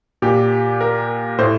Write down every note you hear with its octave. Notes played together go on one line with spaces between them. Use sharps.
A#2 G4
A#4
A2 C5